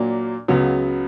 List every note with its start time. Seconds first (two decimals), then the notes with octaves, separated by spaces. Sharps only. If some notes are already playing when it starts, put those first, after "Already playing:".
Already playing: A#2 F#3 A#3 D4
0.48 C#2 C#3 F#3 B3